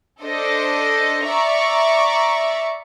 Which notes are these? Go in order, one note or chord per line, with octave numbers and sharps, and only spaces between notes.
D4 A4 C5 D#5
D5 E5 A#5 C#6